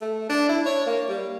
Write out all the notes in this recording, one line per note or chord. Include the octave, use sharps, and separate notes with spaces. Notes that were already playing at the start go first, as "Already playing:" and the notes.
A3
D4
E4
C#5
A#3
G3